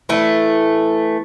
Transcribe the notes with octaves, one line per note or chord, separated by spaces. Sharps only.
E3 A3